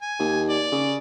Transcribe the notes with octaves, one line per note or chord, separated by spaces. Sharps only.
G#5
D#2
D5
C#3